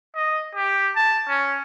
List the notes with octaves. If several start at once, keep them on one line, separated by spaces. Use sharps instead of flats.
D#5
G4
A5
C#4